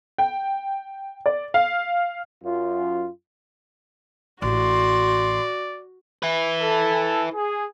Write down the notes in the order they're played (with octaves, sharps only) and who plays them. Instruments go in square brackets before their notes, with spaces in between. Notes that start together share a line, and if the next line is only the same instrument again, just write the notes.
[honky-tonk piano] G5
D5
F5
[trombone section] F#2 F4
[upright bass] A1 [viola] F#4 [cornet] D5 [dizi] C6
[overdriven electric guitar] E4 B4
[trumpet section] A4
G#4